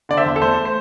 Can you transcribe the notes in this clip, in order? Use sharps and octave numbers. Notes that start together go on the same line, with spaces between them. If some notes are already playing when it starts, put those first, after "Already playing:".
D3 D5
C5 E5
E2
A4
A3 C5
C5